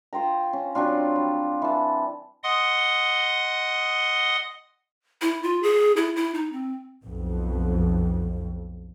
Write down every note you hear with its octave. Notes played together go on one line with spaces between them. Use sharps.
F4 C5 G5 A#5
C#4
F#3 C4 D4 F4
G3
E3 A5
D#5 F#5 C6 D#6
E4
F4
G#4
E4
E4
D#4
C4
B1 F2